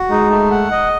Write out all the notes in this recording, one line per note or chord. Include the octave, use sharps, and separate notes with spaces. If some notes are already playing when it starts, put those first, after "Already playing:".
Already playing: F#4
G#3 D#4
A3
F#5
D#5